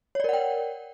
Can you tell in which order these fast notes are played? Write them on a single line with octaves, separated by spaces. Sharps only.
C#5 D5 A#4 F#5 G5